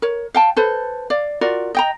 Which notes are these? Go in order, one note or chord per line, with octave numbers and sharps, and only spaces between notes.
A#4 C#5
F5 G5 A5
A4 B4 C5
D5 F5
F4 F#4 A#4 D5
D#5 G5 A#5